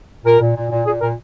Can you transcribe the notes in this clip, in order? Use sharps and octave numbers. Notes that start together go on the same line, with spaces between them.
A#2 A#4
A#2
A#2
A#2
A#2 G#4
A#2 A#4